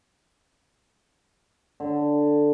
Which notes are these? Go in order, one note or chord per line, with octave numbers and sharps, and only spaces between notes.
D3